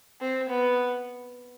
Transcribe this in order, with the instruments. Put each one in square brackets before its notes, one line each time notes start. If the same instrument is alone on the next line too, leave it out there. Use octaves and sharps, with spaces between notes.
[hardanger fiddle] C4
B3